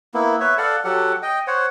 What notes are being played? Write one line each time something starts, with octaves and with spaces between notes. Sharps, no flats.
A#3 B3 E4
B4 C#5 E5
A4 D5 F5 F#5
F#3 G4 A4 F#5
D#5 G5
C5 C#5 F#5